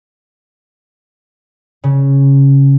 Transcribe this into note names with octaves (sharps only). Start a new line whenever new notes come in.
C#3